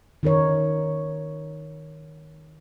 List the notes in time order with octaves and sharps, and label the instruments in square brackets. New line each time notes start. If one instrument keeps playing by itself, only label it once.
[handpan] D#3 D#4 A#4 C#5